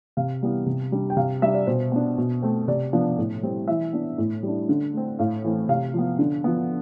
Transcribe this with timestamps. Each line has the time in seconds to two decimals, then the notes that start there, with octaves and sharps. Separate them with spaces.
0.17 C3 F5
0.42 E3 G3 B3
0.66 C3
0.92 G3 D4
1.10 G5
1.17 C3 F5
1.42 G3 D4 E5
1.54 D5
1.67 B2 C5
1.92 B3 D4
2.18 B2
2.42 A3 C4
2.68 C3 D5
2.93 F3 B3 D4
3.18 A2
3.43 G3 C4
3.68 E3 E5
3.93 B3 D4
4.18 A2
4.43 G3 D4
4.69 D3
4.93 A3 C4
5.19 A2 F5
5.44 E3 A3 C4
5.69 C3 F5
5.94 F3 B3
6.19 D3
6.44 F3 B3